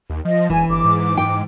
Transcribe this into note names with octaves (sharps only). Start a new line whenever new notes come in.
D#2
F3 D#5
E1 E3 G#5
G1 D6
G#2
G5